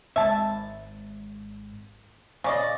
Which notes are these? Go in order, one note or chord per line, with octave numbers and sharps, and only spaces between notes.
G#1 G#2 E5 A5
D#1 C#3 D5 D#5